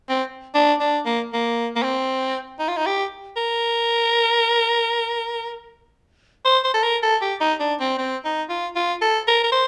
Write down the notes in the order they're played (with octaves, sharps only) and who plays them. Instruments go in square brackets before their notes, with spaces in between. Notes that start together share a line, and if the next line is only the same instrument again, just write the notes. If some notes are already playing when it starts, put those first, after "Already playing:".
[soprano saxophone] C4
D4
D4
A#3
A#3
A#3
C4
D#4
F4
D#4
G4
A#4
C5
C5
A4
A#4
A4
G4
D#4
D4
C4
C4
D#4
F4
F4
A4
A#4
A#4
C5